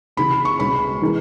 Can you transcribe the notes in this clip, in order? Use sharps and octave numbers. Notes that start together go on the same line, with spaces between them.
D#2 C#3 E3 B5
C#6
C#2 B2 G#3 C#4 B5
E3 G#3 D#4 A#4